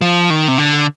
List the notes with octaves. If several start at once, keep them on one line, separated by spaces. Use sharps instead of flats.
F3
D#3
C3
D3